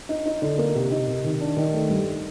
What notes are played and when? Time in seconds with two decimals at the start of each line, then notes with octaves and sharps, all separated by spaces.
0.09 D#4
0.26 D#4
0.42 D3
0.58 A#3
0.75 C3
0.91 D#4
1.08 C3
1.24 D#3
1.41 D4
1.57 D#3
1.74 A3
1.90 G2